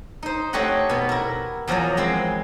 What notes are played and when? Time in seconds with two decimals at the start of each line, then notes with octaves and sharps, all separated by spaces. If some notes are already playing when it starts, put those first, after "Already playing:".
0.23 D#4 C5
0.53 A3 C4 G4 C#5 D#5 F#5
0.89 B2 B3
1.09 E4 A#4
1.67 E2 F3 F#3 A#4 D#5 A#5
1.97 G#3 C4 E4